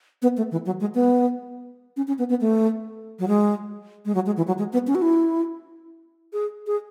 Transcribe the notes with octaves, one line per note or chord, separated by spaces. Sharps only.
B3
A3
E3
F#3
G#3
B3
C#4
C#4
B3
B3
A3
F#3
G#3
G#3
F#3
G#3
E3
F#3
G#3
B3
C#4
F#4
E4
G#4
G#4